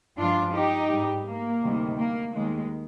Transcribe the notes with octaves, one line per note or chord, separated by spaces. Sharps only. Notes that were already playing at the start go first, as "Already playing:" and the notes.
G2 F3 G#3 D4 F4
D#4 G4
G#2 G3
A#3
D2 C3 D#3 G3
A#3
D#2 D#3 G#3